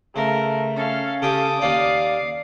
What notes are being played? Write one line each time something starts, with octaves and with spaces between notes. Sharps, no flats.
C#3 A3 A#4
C#4 A4 F5
C#3 G4 A4 D6 D#6
D#2 C#4 D5 F5